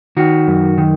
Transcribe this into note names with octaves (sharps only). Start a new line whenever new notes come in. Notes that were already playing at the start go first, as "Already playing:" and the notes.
D#3 F#4
F#2
D#3